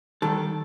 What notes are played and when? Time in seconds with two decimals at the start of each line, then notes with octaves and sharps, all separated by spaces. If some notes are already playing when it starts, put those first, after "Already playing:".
0.22 D#3 G3 A4